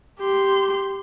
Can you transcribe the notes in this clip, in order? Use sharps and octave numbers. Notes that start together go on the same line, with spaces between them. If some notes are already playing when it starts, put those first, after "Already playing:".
G4 C6